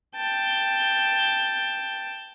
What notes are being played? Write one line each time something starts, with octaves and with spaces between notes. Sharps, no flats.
G5 A5